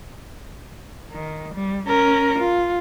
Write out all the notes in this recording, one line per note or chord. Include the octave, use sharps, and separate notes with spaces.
D#3
G3
C#4 A#4
F4